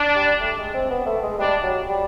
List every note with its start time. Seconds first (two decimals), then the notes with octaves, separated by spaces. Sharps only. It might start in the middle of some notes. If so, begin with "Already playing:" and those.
Already playing: D4
0.15 G3
0.40 A3
0.58 G#3
0.74 C4
0.90 B3
1.06 A3
1.23 G#3
1.39 G3 D4
1.63 F#3
1.89 G3